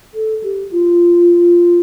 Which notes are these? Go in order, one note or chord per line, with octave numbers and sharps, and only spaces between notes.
A4
G4
F4